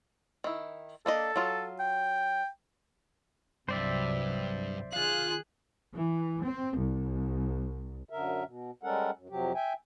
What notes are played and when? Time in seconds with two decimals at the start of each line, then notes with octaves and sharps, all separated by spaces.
0.44 D#3 E4
1.06 A#3 D4 A4 D#5
1.36 F#3 F4
1.80 G5
3.69 C2 G2 C3 F#3 C5 D5 E5
4.93 D#3 F4 G#4 F5 F#6
5.94 E3
6.45 C4
6.79 C2
8.10 F#2 D3 A#4 E5
8.44 B2
8.83 G3 G#3 C#4 A4 A#4 F#5
9.16 F#2
9.29 F2 C3 F#3 G4
9.55 E5 G5 G#5